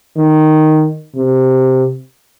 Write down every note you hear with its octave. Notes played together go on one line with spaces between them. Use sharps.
D#3
C3